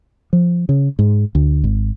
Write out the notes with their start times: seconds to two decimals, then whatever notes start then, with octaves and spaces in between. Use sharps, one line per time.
0.33 F3
0.69 C#3
0.99 G#2
1.35 D2
1.64 G#1